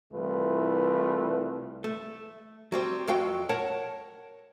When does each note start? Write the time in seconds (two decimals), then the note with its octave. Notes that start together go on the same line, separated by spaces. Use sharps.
0.13 C2 E3 A3 F4 B4
1.84 A3
2.72 F#3 G3 C4
3.08 F2 F#3 F#4 F5 G5
3.49 A#4 C#5 F#5 A5